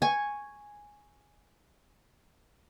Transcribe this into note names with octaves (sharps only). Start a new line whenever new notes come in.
G#5 C#6